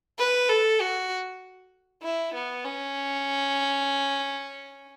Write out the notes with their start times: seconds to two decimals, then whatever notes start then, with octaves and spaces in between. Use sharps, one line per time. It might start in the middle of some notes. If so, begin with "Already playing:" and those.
0.18 B4
0.49 A4
0.81 F#4
2.03 E4
2.34 B3
2.65 C#4